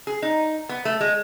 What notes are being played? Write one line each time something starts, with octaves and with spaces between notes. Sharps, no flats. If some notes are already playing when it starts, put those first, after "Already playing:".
G#4
D#4
B3
A3
G#3